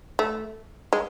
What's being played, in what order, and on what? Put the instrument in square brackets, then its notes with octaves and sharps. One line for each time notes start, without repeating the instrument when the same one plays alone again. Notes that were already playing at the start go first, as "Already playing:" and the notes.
[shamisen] A3
G#3